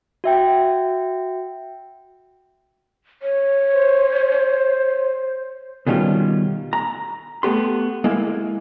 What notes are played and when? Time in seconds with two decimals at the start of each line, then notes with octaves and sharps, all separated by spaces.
0.24 F#4 E5 G5
3.22 C#5
3.73 C5
5.87 B2 D#3 G3 C#4 F4
6.73 A#5
7.43 A3 B3 G4 C6
8.04 G#3 A#3 E4